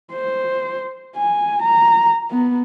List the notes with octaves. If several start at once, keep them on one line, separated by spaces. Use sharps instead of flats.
C5
G#5
A#5
B3